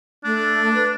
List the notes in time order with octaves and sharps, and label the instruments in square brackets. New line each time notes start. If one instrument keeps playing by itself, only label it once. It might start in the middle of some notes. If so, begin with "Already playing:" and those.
[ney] A3 [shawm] D4
[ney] B4